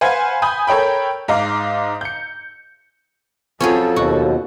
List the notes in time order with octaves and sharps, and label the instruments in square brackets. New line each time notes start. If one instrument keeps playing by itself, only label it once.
[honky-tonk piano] B4 C5 F5 F#5 G#5 G#6
G#5 B5 D#6 G6
A4 A#4 C#5 G5 B5
G#2 D#4 F5 D6
G6 C#7
[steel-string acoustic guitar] F2 F3 F#3 [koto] C#4 G#4 [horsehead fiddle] A4
[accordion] D#2 B2 [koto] F#4